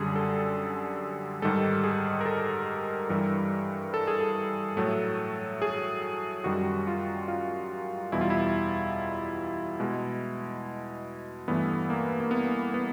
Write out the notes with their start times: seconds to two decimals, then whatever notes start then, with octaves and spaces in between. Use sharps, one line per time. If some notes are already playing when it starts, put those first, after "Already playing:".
Already playing: F#2 D3 G3 G#4
0.16 A4
1.42 G#2 D#3 G3 A4
1.84 G#4
2.21 A#4
2.26 A4
3.09 G2 E3 G3 A#4
3.94 A4
4.07 G#4
4.20 A4
4.77 A2 F#3 A3
5.62 G#4
6.44 F#2 D#3 G3 F#4
6.87 F4
7.28 F4
8.12 E2 B2 G3 E4
8.21 F4
8.30 E4
9.80 B2 G#3
11.48 G2 E3 A3 B3
11.90 A#3
12.20 A#3
12.31 B3
12.74 B3